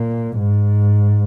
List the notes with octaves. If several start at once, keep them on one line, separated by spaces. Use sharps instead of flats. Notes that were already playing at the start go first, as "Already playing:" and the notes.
Already playing: A#2
G#2